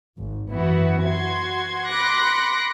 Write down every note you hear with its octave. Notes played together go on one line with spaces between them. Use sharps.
G#1
F#2 E3 B3 E4 F#4
F#4 C6 G#6
B5 C6 D6 F#6 A#6 C#7